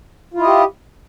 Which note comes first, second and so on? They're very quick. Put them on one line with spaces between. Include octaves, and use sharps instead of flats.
F4 E4 D#5 G4